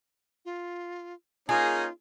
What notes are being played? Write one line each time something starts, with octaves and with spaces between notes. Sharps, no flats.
F4
A#3 C#4 D#4 F4 G#4